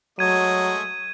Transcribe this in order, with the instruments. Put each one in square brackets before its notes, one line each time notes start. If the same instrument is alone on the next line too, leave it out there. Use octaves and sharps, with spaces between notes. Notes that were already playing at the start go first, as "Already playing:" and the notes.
[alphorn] F#3 [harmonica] G#3 A3 D#5 [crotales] G#6 D#7